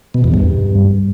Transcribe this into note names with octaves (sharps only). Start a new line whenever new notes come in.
B2
E2
G2